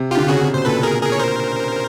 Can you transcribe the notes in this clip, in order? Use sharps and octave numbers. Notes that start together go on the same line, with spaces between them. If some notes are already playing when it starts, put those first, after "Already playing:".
Already playing: C3
F4 G4
D3
C#3 F#4 G#4
C3
B2 C5
A#2 A4 B4
G#4 A#4
G#4 A#4
C#5
A#4 C5